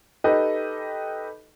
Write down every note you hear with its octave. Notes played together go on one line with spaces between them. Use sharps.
D#4 G4 A4 B4 D#5